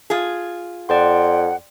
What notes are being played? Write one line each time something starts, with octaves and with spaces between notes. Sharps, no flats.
F4 G#4
F2 D5 F#5 G5 C6